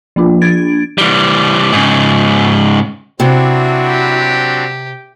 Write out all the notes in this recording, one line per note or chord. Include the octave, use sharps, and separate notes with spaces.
F3 A#3 D4 F4
D4 G#6 A6 D7
E3 G3
G#2 C#3
C3 F#3 C4 D4 E4 F#4
G4